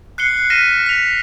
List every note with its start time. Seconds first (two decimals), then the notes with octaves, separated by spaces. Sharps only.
0.18 F#6 C7 C#7 G7
0.50 F6 A#6 B6 D#7 E7
0.86 B6 F7